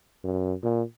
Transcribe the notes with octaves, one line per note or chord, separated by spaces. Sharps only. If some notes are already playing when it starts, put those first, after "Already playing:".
F#2
A#2